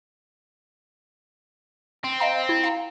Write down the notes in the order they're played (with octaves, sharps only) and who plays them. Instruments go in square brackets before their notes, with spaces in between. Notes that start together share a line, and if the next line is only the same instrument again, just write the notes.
[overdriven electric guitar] C4
[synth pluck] D#5 F5 A#5
E4
F5 A#5